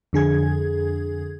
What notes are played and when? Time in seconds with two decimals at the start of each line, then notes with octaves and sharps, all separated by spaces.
0.13 F2 D3 G#4 G#6